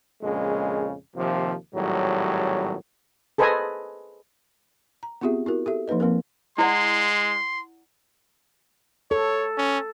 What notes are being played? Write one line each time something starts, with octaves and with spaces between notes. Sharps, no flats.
A#1 F2 C#3 G#3
D#2 C3 F3
G#1 A2 F#3 G3
G#4 A4 B4 C5 D#5 G#5
A#5
B3 C4 F4 G4 G#4 E5
E4 F#4 A#4
G4 A4 E5
F3 A#3 D#4 B4 D#5
F3 A#3 C4 A#4
G#3 E4 D5 F#5 C6
A4 C#5
C#4